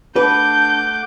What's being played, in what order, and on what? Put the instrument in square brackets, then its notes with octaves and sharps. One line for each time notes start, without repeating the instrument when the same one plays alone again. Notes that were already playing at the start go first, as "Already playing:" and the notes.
[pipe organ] A3 F#5 D6 [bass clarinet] D4 [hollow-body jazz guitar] B4 [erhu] G6